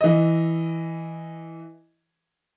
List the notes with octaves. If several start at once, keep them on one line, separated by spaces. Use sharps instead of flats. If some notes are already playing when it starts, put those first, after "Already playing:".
E3 D#5